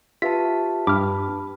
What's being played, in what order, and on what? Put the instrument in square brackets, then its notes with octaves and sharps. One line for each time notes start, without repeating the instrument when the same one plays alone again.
[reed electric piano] F4 E5 [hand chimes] G4 B4 A5 [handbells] B6
[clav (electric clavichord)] G2 [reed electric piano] B5 [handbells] D6 F6